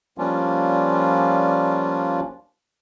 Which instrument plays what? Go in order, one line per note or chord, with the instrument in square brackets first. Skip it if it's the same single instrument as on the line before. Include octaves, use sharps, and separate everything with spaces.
[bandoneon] F3 G3 A#3 C#4 D4 F4